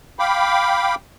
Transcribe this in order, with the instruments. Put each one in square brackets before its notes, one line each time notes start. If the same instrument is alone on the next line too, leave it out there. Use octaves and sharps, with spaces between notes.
[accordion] F5 G5 B5 D6